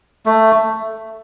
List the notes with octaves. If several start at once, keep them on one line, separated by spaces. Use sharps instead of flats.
A3